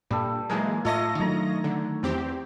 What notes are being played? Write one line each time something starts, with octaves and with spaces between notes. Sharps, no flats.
G2 A#2 G3 A4
E3 F#3 G#3 A#3 D#4 G#5
A2 F4 A4 C#5 D#5 E5 A#6
D#3 F#3 A3 D4 C#5 A#5
D3
E2 C4 G4